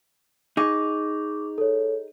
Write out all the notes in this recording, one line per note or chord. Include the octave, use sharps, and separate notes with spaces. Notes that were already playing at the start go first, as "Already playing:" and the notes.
D#4 G#4 C#6 D6
A4 C#5